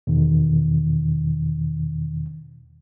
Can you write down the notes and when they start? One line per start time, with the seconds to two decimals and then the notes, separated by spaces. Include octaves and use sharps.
0.07 E2 B2 D#3